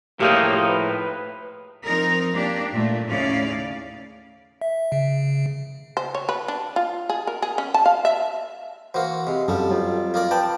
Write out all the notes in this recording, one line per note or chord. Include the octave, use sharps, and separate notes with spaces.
A2 F3 A#3 D#4 G4 G#4 C#5
B4
F3 C4 D#4 A#4
A#3 D4 G4
A#2 A3
D#2 A2 C#3 C#4 D5 F5
E5
C#3
C5
C#5
B4
D4
F4
G#4
A#4
G#4
C#4
A5
F5
E5
E3 A#3 F#4 C5
C3 G#3
F#2 F3 G3 A4
F2 F#3
F3 A#3 D5
B4 D5 G5 A5